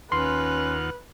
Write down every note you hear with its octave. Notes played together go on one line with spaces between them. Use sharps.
D#2 C#4 F4 B4 F#5 C6